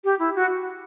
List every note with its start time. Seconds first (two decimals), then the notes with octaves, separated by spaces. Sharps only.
0.04 G4
0.19 E4
0.35 F#4